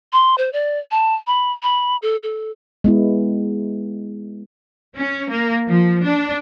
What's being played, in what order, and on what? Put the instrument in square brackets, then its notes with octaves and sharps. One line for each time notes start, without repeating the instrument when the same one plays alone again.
[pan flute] C6
C5
D5
A5
B5
B5
A4
A4
[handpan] G#3 B3 E4
[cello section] C#4
A#3
F3
D4